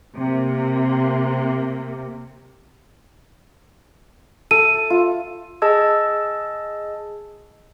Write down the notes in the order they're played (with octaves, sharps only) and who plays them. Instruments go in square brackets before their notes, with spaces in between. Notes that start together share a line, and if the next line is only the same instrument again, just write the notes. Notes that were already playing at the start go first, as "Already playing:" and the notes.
[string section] C3 A#3
[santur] A4 [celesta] D#7
[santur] F4
[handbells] G#4 D#5 A5 E6 G#6